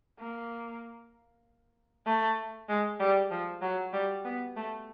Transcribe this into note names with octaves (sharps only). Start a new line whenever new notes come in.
A#3
A3
G#3
G3
F3
F#3
G3
B3
A3